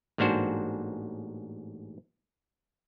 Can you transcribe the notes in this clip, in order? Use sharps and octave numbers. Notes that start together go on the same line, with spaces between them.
A1 G#2 A#3 D4 F#4 C5